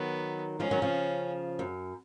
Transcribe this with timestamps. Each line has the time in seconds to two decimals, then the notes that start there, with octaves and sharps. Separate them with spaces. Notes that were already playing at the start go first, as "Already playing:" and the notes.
Already playing: D#3 F#3 B3
0.60 F3 G#3 C#4
0.71 D#3 F#3
0.82 C#3 F3
1.59 F#2